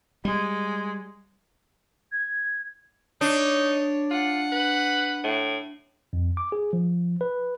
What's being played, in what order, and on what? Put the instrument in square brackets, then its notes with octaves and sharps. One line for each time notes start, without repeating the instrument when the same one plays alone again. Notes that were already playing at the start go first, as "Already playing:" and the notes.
[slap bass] G3 [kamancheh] G#3
[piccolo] G#6
[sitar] D4 [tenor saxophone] D#4 [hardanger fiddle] C#5
[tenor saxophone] F4 [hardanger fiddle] F#5
[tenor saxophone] B4
A2
[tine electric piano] F2
D6
G#4
F3
B4